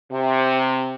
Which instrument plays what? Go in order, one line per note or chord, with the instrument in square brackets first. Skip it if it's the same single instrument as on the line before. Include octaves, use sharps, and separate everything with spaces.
[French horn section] C3